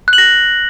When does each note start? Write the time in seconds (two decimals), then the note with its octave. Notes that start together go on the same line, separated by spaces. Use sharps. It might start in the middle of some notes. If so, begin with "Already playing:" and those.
0.08 F#6
0.13 F#7
0.18 A#6